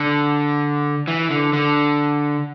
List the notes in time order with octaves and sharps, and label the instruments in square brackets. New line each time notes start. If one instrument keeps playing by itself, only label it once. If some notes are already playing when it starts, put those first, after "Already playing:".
Already playing: [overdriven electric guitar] D3
E3
D3
D3